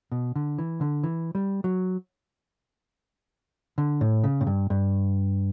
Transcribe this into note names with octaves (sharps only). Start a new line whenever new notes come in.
B2
D3
E3
D3
E3
G3
F#3
D3
A2
C#3
A2
G2
G2